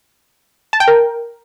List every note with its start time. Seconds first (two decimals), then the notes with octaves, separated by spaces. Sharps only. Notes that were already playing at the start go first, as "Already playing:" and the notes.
0.73 A5
0.80 G5
0.88 A#4